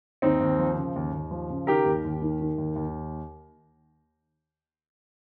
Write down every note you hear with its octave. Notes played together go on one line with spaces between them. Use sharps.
D#2 C4 D#4
D#2
F3
C#3
D#2
D#2
F3
C#3
D#3 G4 A#4
D#2
D#2
D#3
D#3
D#2
D#2